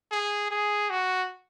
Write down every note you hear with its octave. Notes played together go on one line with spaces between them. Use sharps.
G#4
G#4
F#4